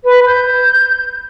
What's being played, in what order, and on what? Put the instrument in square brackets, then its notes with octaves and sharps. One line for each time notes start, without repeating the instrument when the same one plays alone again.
[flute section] B4
G6